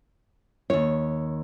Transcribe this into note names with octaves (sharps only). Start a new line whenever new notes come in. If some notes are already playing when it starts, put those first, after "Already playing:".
D#2 C#5